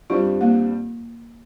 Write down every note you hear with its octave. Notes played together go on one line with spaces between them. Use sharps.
G2 G3 C4 F4
A#3